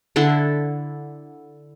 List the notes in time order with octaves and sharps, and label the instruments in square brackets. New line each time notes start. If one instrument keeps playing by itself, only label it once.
[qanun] D3 D4 E4 A4